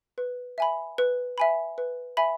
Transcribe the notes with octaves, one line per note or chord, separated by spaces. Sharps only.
B4
E5 G#5 B5
B4
E5 G#5 B5
B4
E5 G#5 B5